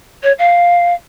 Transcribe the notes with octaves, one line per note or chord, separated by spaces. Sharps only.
C#5
F5